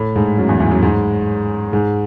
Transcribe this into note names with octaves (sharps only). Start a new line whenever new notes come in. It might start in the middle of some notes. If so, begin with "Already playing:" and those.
Already playing: A2 A3
G#2 G#3
F#2 F#3
E2 E3
E2 E3
F#2 F#3
G#2 G#3
G#2 G#3